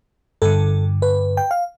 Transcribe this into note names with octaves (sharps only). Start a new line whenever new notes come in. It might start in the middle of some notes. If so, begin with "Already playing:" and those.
G2 D3 A4
B4
G5
F5